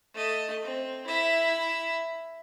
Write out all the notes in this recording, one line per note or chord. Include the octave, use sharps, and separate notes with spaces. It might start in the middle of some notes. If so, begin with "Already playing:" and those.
A3 D#5
C4
E4 E5